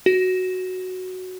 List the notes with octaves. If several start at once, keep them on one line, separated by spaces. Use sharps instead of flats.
F#4